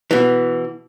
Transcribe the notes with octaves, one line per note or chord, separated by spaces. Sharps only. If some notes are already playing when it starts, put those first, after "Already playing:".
B2 E3